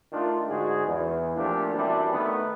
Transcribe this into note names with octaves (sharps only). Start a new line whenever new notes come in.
D#3 A3 D4 F4
G#2 D3 G#3 F#4 G#4
E2
A#2 F3 A3 D4 F4 G4
F#2 E3 G3 C4 D4
D#3 A3 B3